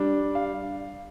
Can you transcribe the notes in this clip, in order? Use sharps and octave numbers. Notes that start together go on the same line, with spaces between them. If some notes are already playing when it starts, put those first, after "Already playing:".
Already playing: G3 D4
F5